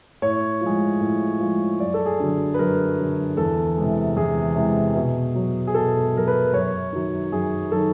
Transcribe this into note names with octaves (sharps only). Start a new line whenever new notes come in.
A2 C#5
F3 G#3
A2
F3 G#3
F#2 D5
A4
G#4
D3 F#3
B4
F#2 A#4
D3 F#3
E2 A4
C3 E3 G#3
E2 G#4
C3 E3 G#3
B2
F#3
G#4
B2 A4
F#3 A#4
B4
F#2 C#5
D#3 F#3
F#2 G#4
D#3 F#3 A4